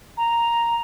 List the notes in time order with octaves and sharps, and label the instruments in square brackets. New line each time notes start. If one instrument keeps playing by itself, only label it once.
[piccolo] A#5